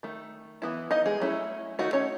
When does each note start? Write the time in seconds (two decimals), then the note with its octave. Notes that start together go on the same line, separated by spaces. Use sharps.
0.03 D#3 A3
0.62 E3 B3 E4
0.91 D#4 D#5
1.06 G#3 G#4
1.20 F#3 A3 C#4 E4
1.79 D#3 A3 D#4 F#4
1.93 C#4 C#5